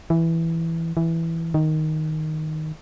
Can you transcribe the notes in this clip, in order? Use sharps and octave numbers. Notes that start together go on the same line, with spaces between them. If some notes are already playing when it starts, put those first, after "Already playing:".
E3
E3
D#3